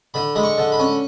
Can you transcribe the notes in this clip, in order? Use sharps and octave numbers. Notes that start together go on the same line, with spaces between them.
D3 B5
G#3 B5
C#6
D3
B5
C#4